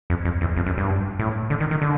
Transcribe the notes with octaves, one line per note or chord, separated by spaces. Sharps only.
F2
F2
E2
F2
F#2
G2
A2
D3
D#3
D#3
D3